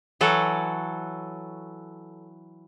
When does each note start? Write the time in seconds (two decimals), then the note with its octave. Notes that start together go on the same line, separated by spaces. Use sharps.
0.21 E3 F#3 A4 C#5